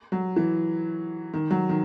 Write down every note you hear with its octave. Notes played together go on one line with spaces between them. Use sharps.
F#3
E3
D#3
F#3
D#3